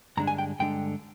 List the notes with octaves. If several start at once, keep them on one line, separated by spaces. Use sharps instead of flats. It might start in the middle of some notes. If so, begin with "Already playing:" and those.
G2 D3 G#3 D4 A#5
G#5
G5
G2 D3 G#3 D4 G5